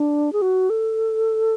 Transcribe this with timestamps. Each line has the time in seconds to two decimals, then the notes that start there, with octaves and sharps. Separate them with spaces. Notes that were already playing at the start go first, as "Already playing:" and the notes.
Already playing: D4
0.33 G#4
0.42 F#4
0.70 A4